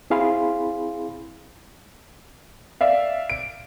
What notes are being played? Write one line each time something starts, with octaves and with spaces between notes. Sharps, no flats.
C4 E4 G#4 F5 B5 C6
D5 E5 F5
D7